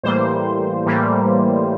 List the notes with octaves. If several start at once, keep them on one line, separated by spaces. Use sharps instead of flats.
A2 E3 G3 A#3 C5
A2 E3 G3 A#3